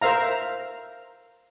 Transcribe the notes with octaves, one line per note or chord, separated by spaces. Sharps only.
A#4 C5 E5 F5 A#5